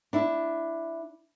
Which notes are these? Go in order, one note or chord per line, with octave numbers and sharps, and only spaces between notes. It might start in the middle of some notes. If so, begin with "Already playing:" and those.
D4 E4